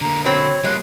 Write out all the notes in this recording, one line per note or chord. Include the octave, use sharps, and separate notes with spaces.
D3 A#3 A#5
F#3 C4 C#5 B5
G3 G#3 A#3 F4 F#6